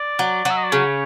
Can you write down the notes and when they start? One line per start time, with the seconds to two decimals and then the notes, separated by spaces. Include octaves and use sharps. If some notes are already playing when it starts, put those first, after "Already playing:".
Already playing: D5
0.19 F#3
0.45 F#3 E5
0.56 D#5
0.64 D5
0.71 C#3 C#5